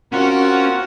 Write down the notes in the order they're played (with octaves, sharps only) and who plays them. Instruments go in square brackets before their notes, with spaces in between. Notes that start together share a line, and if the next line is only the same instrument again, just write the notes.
[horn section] C4 A#4 [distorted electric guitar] C#4 [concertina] F4 F#5 [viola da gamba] F#4